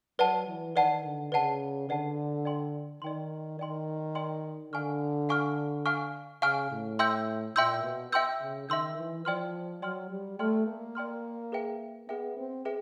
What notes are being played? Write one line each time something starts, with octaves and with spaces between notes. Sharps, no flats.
F#3 B4 D5 F#5 A5
E3
D#3 B4 D5 F#5 A5
D3
C#3 B4 D5 F#5 A5
D3 B4 D5 F#5 A5
D5 G5 C6
D#3 D5 G5 C6
D#3 D5 G5 C6
D5 G5 C6
D3 F5 G#5 C#6 F6
F5 G#5 C#6 F6
F5 G#5 C#6 F6
C#3 F5 G#5 C#6 F6
A2
E5 G5 C6 E6 G6
A#2 E5 G5 C6 E6 G6
B2
E5 G5 C6 E6 G6
C#3
D#3 E5 G5 C6 E6 G6
E3
F3 D5 G5 C6 F6
F#3 D5 G5 C6 F6
G3
A3 D5 G5 C6 F6
A#3
D5 G5 C6 F6
G#4 B4 E5 G5
B3 G#4 B4 E5 G5
C4
G#4 B4 E5 G5